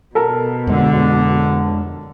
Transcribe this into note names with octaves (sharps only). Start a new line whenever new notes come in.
B2 A4 A#4
F2 D3 G#3 D4